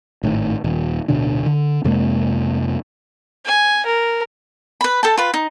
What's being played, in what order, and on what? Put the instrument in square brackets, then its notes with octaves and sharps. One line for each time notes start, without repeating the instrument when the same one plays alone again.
[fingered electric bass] G#1 A2 D#3
D#1
D1 B2 D3 D4
D3
F2 C3 G#3 A#3
[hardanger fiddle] G#5
A#4
[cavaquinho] B4 B5
A4 G5 A5
F4 B4
D#4